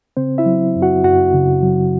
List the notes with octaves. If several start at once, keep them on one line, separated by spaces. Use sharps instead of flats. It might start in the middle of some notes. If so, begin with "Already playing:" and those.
C#3 C4 C5
E4 E5
F#3
F#2
F#4 F#5
F#2 F#4 F#5
C#3
F#3